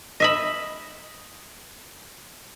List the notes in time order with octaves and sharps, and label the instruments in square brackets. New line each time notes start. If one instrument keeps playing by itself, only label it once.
[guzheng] D#5 E5 B5